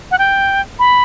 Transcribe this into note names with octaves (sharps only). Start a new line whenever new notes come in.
F#5
G5
B5